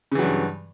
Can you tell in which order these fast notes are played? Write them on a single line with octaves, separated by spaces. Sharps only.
C#3 E3 F#3 G2